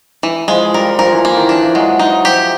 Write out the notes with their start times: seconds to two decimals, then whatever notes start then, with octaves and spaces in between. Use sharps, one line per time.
0.23 E3
0.48 F3 G#3
0.74 G3 A#4
0.87 G3
0.99 F3 A#4
1.12 E3
1.24 E3 A#3
1.37 D#3
1.49 E3 D4
1.62 F3
1.75 F#3 G#3
1.99 D#4
2.25 F3 G4